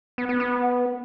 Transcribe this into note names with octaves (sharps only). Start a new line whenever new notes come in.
B3
B3
B3